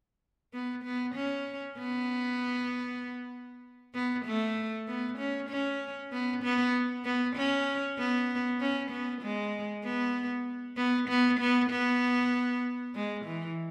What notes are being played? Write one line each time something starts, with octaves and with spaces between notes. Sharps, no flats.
B3
B3
C#4
B3
B3
A3
B3
C#4
C#4
B3
B3
B3
C#4
B3
C#4
B3
G#3
B3
B3
B3
B3
B3
G#3
E3